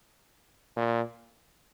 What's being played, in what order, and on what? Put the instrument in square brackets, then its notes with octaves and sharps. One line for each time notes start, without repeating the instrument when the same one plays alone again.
[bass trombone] A#2